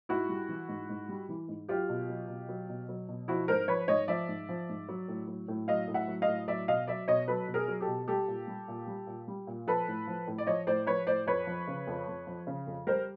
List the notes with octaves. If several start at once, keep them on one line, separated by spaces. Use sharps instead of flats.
G#2 E4 F#4
G3
E3
G#2
G#2
G3
E3
G#2
F#3 F4 G4
B2
F#3
B2
F#3
B2
F#3
B2
F3 E4 F#4
G#2 A#4 C5
F3 B4 C#5
G#2 C#5 D#5
F3 D5 E5
G#2
F3
G#2
F#3
A2
F#3
A2
F#3 D#5 F5
A2
E5 F#5
F#3
D#5 F5
A2
F#3 D5 E5
B2 D#5 F5
F#3 D5 E5
B2 C#5 D#5
F#3 A4 B4
B2
G#4 A#4
F#3
G4 A4
B2
G3 G4 A4
A#2
G3
A#2
G3
A#2
G3
A#2
F3 A4 B4
A2
F3
A2
D5
F3 C#5 D#5
A2 C5 D5
F3 B4 C#5
A2 C5 D5
F2 B4 C#5
F3
C#3
F2
F2
F3
C#3
F2
G3 A#4 C5